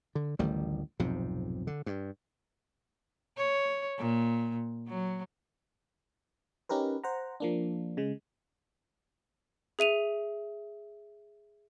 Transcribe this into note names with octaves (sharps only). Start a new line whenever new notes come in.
D3
A1 D2 D#3 G3
B1 F2 G#2 C3
D3
G2
C#5
A#2
F#3
C#4 D#4 G4 A#4 B4
C5 F#5 A#5
F3 A#3 D4
C#3 G#3
G#4 E5 D#7 F7